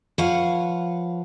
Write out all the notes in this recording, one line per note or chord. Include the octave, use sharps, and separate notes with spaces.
F3 B4 C#5 F5 F#5